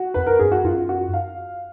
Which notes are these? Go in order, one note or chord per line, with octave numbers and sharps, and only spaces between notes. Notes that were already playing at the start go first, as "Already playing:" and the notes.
Already playing: F#4
F2 B4
A#4
F#2 G#4
F#4
F#2 F4
F#4
F5